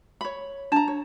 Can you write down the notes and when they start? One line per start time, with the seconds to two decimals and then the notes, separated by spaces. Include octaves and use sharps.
0.21 C#5 B5
0.72 D4 A5 A#5
0.88 C#5